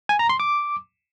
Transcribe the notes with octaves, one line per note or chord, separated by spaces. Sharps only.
G#5
A#5
C6
D6